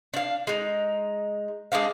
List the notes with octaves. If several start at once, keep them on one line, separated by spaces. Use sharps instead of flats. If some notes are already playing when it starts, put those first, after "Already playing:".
D4 F5
G#3 D#4
G#3 C4 D4 F5